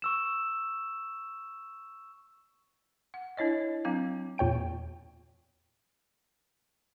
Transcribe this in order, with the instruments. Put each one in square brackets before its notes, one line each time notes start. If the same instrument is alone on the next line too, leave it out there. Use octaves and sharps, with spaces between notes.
[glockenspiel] C#6 E6 E7
[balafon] F#5
D4 E4 C#5 D#5
F#3 C4 D4 F5 A#5
[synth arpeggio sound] E2 A#2 C#5 G5 D7